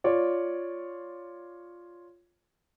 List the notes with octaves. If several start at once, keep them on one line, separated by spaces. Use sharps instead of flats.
F4 C#5 D5